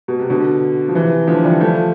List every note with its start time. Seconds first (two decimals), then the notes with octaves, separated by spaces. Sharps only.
0.08 B2
0.19 C3
0.30 B2 D3
0.88 F3
0.95 C3 E3
1.27 D3 F3
1.44 E3 G3
1.61 F3 A3